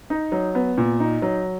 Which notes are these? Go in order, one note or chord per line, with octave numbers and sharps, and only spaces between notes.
D#4
F#3
B3
A#2
D#4
F#3